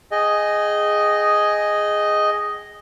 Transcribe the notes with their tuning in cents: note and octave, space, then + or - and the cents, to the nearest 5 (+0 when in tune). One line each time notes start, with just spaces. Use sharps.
G#4 +0 D#5 +0 G5 -35